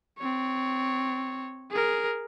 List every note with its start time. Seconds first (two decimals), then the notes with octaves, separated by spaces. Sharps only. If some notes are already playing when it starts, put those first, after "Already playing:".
0.19 C4 C#5
1.71 G#4 A#4